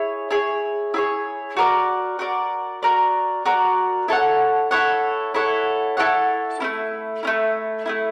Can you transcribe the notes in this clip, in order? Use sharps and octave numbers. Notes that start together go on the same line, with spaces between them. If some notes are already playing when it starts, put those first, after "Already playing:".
Already playing: E4 G#4 C#5
E4 G#4 C#5
E4 G#4 C#5
F#4 A#4 D5
F#4 A#4 D5
F#4 A#4 D5
F#4 A#4 D5
E4 A4 C#5 F#5
E4 A4 C#5 F#5
E4 A4 C#5 F#5
E4 A4 C#5 F#5
A3 C#4 E4
A3 C#4 E4
A3 C#4 E4